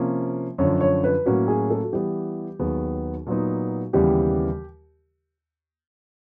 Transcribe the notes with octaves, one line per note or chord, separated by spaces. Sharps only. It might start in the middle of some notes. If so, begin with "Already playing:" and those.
Already playing: C3 F3 A#3 C#4
F#2 D3 F3 C#5
C#5
B4
A2 F#3 A#3 C#4 F#4
G#4
A4
F#4
E3 G3 B3 G4
D#2 D#3 F#3 B3 G#4
A#2 F#3 B3 D#4
D#2 C#3 E3 G3 B3 G4